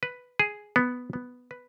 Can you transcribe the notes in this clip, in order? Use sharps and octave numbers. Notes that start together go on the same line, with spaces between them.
B4
G#4
B3
B3
B4